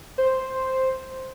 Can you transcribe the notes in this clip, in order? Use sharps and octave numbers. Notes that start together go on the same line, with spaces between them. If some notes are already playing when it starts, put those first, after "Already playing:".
C5